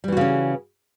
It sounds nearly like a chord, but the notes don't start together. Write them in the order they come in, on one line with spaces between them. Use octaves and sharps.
G3 E3 F#4 C#3 C#4